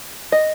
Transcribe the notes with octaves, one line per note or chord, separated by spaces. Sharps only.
D#5